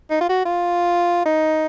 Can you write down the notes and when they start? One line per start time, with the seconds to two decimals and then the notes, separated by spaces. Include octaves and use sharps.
0.11 D#4
0.21 F4
0.29 F#4
0.45 F4
1.25 D#4